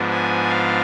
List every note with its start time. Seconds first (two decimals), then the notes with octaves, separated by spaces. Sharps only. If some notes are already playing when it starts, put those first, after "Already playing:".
Already playing: G#2 F3 B3 D4
0.11 G#5
0.49 F5